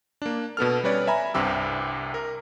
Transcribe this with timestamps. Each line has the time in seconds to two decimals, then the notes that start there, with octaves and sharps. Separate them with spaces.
0.22 A#3 D4
0.57 B2 B3 A4 F6
0.83 G3 C#4 B4 C#5 D5
1.07 E5 G#5 A#5 B5
1.34 C2 G2 C3 G4 E6
2.14 A#4